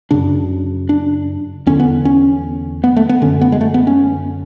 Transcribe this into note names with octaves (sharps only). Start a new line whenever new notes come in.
F#2 C#3 D4
D4
E2 D3 C#4
B3
C#4
B3
A3
B3
F#2 D3 C#4
B3
G#3
A3
B3
C#4